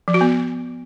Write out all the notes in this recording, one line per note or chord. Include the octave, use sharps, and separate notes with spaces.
F3
F#4
B3